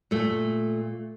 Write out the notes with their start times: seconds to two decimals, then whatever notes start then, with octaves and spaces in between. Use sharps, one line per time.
0.11 A#2 A3